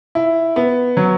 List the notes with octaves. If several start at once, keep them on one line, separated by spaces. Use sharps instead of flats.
E4
B3
F#3